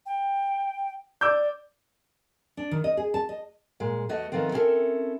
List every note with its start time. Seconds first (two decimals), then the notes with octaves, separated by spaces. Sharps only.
0.06 G5
1.21 D5 D6 E6 G6
2.57 D4
2.71 D#3
2.84 D#5
2.97 G#4
3.14 A5
3.29 D#5
3.80 A#2 G#3
4.09 E2 A3 F#4 D#5
4.32 D#3 F3 A3 B3 C4
4.52 C4 C#4 E4 F4 A4 A#4